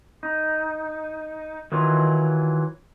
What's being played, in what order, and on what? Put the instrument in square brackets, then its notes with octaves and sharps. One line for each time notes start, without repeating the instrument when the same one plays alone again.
[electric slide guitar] D#4
D#3 E3 F#3 F4